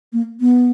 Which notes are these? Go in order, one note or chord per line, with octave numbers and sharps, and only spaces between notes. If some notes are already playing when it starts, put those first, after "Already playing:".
A#3
B3